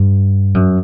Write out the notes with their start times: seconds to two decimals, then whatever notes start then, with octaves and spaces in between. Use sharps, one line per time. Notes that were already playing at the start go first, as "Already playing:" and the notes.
Already playing: G2
0.54 F#2